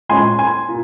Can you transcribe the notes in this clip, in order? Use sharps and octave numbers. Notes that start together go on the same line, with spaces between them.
A#2 G#3 C#4 G#5 C6
G#5 C6
A#2